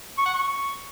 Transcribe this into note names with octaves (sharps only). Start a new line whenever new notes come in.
C#6
F#5
C#6